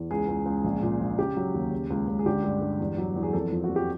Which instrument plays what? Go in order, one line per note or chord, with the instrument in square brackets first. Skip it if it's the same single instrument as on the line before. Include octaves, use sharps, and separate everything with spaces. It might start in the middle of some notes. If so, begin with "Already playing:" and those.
Already playing: [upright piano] E2
C#2 G#4
C#2
C#2
A#1
A#2
A#1
C#3 G4
F#3
D#2
C#3
C#2
C#2
G#4
D3 G4
G2
G2
E2
F#3
E2
G#4
F2 A4
F3
F#4
F2
G4